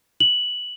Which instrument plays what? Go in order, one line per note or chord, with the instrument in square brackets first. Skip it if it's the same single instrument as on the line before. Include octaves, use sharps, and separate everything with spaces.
[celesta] F#7